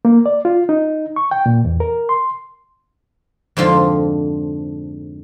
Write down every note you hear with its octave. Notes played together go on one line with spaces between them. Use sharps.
A#3
D5
F4
D#4
C#6
G5
A#2
E2
A#4
C6
F2 G#2 D3 F4